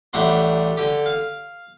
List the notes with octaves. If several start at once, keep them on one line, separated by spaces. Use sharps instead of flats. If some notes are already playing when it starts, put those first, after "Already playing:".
A1 G3 A3 D4 F#5 C6
D3 G4
F5